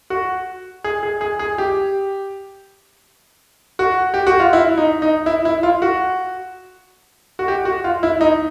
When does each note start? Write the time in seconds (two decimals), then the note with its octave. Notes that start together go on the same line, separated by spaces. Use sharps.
0.10 F#4
0.84 G#4
1.03 G#4
1.21 G#4
1.39 G#4
1.58 G4
3.79 F#4
4.14 G4
4.27 F#4
4.40 F4
4.53 E4
4.78 D#4
5.02 D#4
5.26 E4
5.45 E4
5.63 F4
5.82 F#4
7.39 F#4
7.48 G4
7.65 F#4
7.84 F4
8.03 E4
8.21 D#4